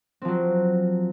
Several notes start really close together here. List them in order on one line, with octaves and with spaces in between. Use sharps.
C4 F3 F#3